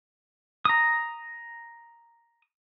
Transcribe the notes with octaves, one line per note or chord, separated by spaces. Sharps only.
A#5 D#6